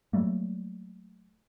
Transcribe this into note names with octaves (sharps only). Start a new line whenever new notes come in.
F#3 G3 A3 A#3